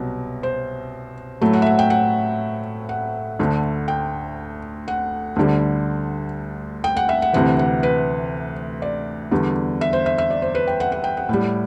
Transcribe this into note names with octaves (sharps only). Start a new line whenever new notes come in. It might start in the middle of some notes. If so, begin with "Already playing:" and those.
Already playing: C2 B2 F#3
C5
A2 F#3 A3
F#5
E5
F#5
G5
F#5
F#5
D2 D3 A3
G5
F#5
D2 D3 G3
G5
F#5
E5
F#5
D2 C3 E3 F#5
F#5
B4
D5
E2 D3 G3
E5
C5
E5
E5
D5
C5
B4
G5
F#5
F#5
G5
F#5
A2 G3